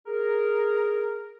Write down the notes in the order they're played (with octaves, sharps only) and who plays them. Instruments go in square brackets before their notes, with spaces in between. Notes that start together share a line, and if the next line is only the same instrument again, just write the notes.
[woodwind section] G#4 A#4